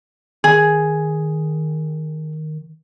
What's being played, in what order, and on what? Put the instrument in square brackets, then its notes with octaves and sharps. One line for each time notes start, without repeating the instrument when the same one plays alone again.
[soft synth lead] D#3 [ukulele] G#4